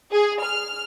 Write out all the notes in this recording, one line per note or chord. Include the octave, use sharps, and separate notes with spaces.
G#4
F6